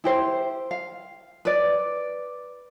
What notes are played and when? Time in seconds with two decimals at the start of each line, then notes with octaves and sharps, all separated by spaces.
0.04 E4 G4 C5
0.71 F5
1.45 B4 D5